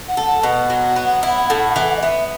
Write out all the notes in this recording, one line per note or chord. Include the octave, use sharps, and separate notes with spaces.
F#5
A4
F#5
B2 F#5
F#3
B3
E4
A2
E3
D#5
B3 E5